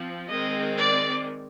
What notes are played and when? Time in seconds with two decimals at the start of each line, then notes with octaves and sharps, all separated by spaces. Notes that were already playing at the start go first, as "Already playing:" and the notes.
Already playing: F3 C4
0.29 D#3 G#3 C4 D#5
0.77 D5